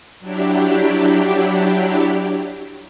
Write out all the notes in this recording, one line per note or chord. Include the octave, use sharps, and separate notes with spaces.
F#3 D4 E4 G4